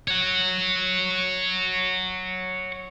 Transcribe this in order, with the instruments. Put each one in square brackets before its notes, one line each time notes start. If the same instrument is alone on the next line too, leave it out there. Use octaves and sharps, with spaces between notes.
[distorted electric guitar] C#5 F#5